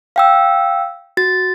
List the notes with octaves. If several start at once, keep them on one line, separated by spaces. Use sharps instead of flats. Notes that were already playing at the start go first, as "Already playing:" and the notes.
F5 G5 E6
F#4 A6